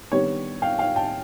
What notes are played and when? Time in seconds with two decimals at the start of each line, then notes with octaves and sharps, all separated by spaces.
0.11 D#3 G3 B3 D4 C#5
0.62 F5 G5
0.79 F5 G5
0.96 G5 A5